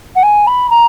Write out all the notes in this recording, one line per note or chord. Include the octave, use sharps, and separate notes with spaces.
F#5
G#5
B5
A#5